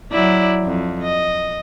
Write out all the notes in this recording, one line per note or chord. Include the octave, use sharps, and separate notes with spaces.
F#3 E4 D5
F2
D#5